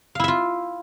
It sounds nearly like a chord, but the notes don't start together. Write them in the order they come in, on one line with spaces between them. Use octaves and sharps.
F5 E4 E5 F4